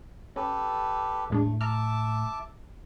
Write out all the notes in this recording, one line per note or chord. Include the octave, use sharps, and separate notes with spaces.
C#4 G4 A4 B4
E2 A2 G#3 A3 D4
E5 A5 A#5 D6 F6